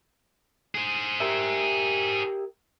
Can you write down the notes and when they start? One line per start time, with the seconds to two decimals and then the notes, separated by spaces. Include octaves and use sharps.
0.75 G#4 C5
1.20 G4 A#4 E5